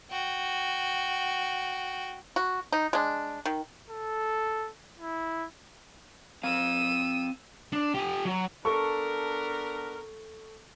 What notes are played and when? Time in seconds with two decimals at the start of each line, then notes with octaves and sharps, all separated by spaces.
0.11 F#4 G5
2.36 F#4
2.72 D#4
2.93 G#3 D4
3.45 D#3
3.89 A4
4.98 E4
6.43 C4 F5 E6 D#7
7.73 D4
7.94 G4 G#5
8.25 F#3
8.65 B3 D4 A4 A#4 C#6